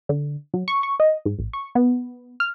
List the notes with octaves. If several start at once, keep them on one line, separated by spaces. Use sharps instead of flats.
D3
F#3
C#6
C#6
D#5
G#2
A1
C#6
B3
F6